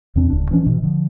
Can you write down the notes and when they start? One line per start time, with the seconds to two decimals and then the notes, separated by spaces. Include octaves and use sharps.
0.16 E2 C3 C4 D4
0.30 D1 C#2 D4
0.51 E3 F3 C#4 D4
0.65 G#1 B2 E3
0.83 D3 F3